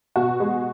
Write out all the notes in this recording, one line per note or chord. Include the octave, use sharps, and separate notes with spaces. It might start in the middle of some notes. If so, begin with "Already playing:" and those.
B2 F#4
G#3